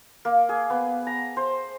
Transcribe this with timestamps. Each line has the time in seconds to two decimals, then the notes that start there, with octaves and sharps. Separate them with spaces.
0.25 A#3
0.49 G#4
0.70 B3
1.07 A#5
1.37 C5